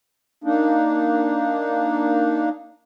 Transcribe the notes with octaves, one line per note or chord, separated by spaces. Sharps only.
A#3 D4 D#4